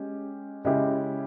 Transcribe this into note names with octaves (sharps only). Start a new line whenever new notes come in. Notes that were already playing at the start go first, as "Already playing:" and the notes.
Already playing: G#3 C#4 G4
C#3 G#3 C#4 E4 G4